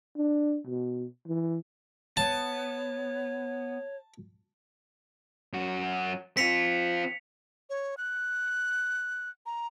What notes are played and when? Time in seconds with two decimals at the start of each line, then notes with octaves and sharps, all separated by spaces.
0.17 D4
0.66 B2
1.27 E3
2.17 B3 C#5 A5
5.53 F#2 F#4
6.37 C4 F4 B6 C#7 F7
7.70 C#5
7.97 F#6
9.46 A#5